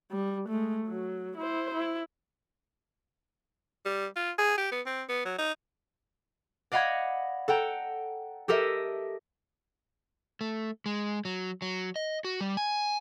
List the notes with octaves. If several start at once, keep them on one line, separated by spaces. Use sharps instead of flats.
G3
G#3 A3
F#3
E4 C5
E4
G3
F4
G#4
G4
B3
C4
B3
F#3
D#4
D5 D#5 F5 F#5 B5 G#6
A4 F#5 G5 A#5
G4 A4 A#4 D#5 E5
A3
G#3
F#3
F#3
D#5
F#4
G3
G#5